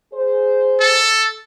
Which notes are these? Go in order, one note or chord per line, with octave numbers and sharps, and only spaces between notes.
G#4 C5
A4